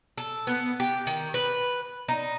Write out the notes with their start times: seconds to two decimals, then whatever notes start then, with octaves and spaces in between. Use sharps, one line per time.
0.18 A4
0.47 B3
0.80 G4
1.07 D#3
1.34 B4
2.08 D#4